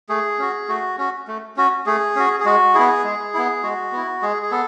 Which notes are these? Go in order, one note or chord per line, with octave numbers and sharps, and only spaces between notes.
A3 G#4
C#4 F#4
A3 F#4
C#4 F#4
A3
C#4 F#4
A3 G#4
C#4 F#4
G#4
G#3 F#4
B3 E4 G#4
G#3
B3 E4
G#3 F#4
B3 E4
G#3 G#4
G#4
B3 A4